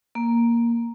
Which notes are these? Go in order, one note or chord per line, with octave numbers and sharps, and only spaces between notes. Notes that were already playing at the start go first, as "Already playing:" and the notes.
A#3